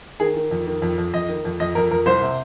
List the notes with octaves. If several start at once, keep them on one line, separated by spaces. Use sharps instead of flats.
D#3 G#4
D#3
F2
D#3
F2
F2
F2 D#5
D#3
F2
F2 D#5
F2 A#4
F2 A#4
C2 C5
C3